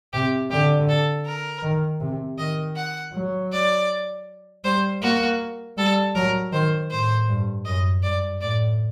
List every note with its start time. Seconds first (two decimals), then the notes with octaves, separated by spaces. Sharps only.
0.13 C3 G4
0.51 D3 G4
0.89 A4
1.26 A#4
1.63 D#3
2.01 C3
2.39 D#3 D#5
2.76 F#5
3.14 F#3
3.52 D5
4.64 G3 C5
5.02 A#3 F#4
5.77 G3 A4
6.15 F#3 A#4
6.52 D#3 C5
6.91 A2 C5
7.28 G2
7.65 F#2 D#5
8.03 G2 D5
8.41 A2 D5